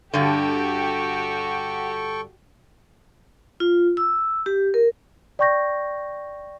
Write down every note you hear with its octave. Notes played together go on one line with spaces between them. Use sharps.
G2 D3 F#4 G4 A4 G5 C#6
F4
E6
G4
A#4
D5 G5 C#6 G6 A#6